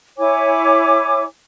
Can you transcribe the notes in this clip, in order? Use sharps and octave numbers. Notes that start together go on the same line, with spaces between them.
E4 C#5 G#5 D6